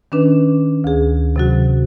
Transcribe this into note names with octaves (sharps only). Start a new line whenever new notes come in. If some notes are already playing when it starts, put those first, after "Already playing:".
D#3 C#4 D4 B4
D2 G#4
C3 F#3 F#4